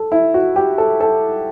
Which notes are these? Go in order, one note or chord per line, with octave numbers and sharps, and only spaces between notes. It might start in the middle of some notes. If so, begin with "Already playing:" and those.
Already playing: A4
E4
F#4
G4
A4
A4